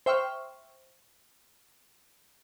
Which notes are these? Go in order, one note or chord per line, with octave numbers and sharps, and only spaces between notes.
C5 E5 G5 C#6 F6